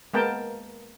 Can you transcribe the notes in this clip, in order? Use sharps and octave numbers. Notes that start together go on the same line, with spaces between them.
G#3 A#3 B3 A#4 G5 A5